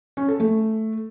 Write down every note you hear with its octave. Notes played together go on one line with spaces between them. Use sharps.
C#4
A4
A3